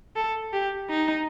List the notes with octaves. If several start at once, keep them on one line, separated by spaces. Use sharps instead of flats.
A4
G4
D#4